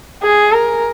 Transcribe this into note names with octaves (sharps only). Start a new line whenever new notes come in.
G#4
A#4